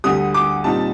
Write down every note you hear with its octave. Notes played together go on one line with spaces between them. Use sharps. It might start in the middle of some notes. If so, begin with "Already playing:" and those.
D2 D3 G3 D#6
D6
A#2 G3 C4 D#4 A5